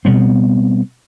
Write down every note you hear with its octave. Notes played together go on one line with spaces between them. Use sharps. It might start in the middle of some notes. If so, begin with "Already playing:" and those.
B2 G3 B3 C4